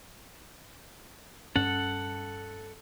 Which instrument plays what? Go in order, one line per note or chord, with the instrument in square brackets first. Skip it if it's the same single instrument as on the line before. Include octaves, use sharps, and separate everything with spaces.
[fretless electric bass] G2 C#4 [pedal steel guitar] A4 F#5